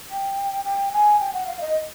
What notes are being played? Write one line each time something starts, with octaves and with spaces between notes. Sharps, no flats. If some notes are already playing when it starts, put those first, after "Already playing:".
G5
G5
G#5
G5
F#5
F5
D#5